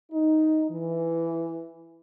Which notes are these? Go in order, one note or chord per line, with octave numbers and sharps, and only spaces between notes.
D#4
E3